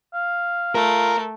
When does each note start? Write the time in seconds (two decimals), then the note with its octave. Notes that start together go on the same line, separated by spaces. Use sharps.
0.14 F5
0.75 A3 F4 A#4